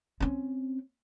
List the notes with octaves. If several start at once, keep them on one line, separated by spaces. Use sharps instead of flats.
C4 C#4